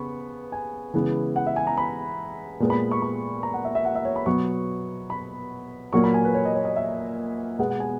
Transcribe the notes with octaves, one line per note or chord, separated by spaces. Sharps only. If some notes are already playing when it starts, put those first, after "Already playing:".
Already playing: C#3 B3 B5 C#6
G#5
C#3 E3 G#3 B3
F#5
E5
G#5
A#5
B5
A#2 G#3 B3
B5
C#6
B5
A#5
F#5
E5
E5
F#5
E5
C#5
B5
B2 F#3 B3 C#6
B5
A#2 F#3 A#3 C#6
B5
G#5
B4
C#5
D#5
C#5
D#5
E5
B2 G#3 B3 F#5
F#5
G#5